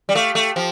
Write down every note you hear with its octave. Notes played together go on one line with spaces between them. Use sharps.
G3
A3 G4 F5
A3
F3 G4